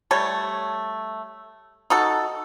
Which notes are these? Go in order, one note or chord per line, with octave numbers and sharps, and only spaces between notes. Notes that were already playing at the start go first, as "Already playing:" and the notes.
G3 A3 A4 C#5
D#4 F#4 A4